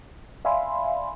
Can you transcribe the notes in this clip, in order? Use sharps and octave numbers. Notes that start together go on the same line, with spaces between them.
D5 E5 F5 G#5 B5 C6